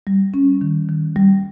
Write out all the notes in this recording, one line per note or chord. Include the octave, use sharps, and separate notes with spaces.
G3
C#4
D#3
D#3
G3